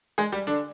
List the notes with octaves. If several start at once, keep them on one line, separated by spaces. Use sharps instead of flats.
G#3 G#4
G3 G4
D3 D4